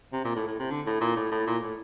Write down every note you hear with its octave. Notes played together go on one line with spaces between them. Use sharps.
C3
A#2
A2
A2
C3
D3
A2
A#2
A2
A2
A#2
A2